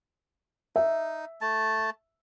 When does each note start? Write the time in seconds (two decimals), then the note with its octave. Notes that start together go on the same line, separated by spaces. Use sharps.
0.76 D#4 E5
1.41 A3 A5